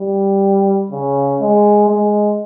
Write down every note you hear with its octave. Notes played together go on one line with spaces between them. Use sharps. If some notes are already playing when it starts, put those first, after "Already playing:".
Already playing: G3
C#3
G#3
G#3